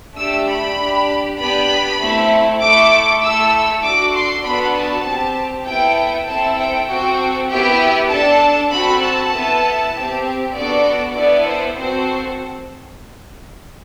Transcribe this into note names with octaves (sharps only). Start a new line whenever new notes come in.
A3 D4 G4 E6
B5
D4 G4
B3 D4 G4 B5
A3 C4 E4
A3 E4 A4 D6
A3 E4 A4 E6
D4 F#4 A4 D6
C6
B3 D4 F#4 A4 B5
A5
C4 G4
B3 E4 A4 G5
C4 E4 A4 A5
G5
C4 F#4 A4 G5
B3 E4 G4 G5
D4 A4 A5
C4 F#4 A4 B5
A5
B3 E4 A4
C4 G4
B3 D4 F#4 A4 D5
B3 E4 A4 D5
C5
C4 F#4 A4 C5